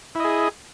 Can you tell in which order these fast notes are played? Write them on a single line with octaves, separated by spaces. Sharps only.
E4 D#5 G#4